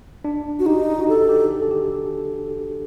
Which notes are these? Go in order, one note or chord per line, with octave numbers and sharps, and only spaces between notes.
D4
F#4
D#4 G4
F#4
G4 A4
G4
A4
A4
G4